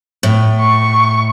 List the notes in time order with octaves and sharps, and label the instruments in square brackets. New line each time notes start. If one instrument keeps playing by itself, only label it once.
[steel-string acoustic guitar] A2
[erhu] C#6